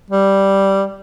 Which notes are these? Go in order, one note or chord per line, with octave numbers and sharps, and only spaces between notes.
G3